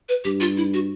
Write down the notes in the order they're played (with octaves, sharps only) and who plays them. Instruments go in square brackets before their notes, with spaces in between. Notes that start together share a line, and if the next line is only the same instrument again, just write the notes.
[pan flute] B4
[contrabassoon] G2 [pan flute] G4
[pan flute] F4
E4
F#4